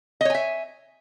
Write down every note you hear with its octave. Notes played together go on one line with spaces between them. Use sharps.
C#5 D#5 E5 G#5